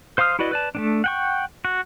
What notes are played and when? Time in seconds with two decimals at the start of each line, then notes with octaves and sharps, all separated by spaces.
0.18 C5 F5 C6 D#6 F6
0.39 E4 F#4 B4 D5 D#5
0.51 B4 D5 A5
0.75 A3 B3 D4
1.04 F#5 G5 C#6
1.65 F#4